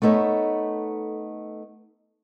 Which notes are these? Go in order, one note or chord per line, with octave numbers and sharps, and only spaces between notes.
A3 B3 D#4 A4 C#5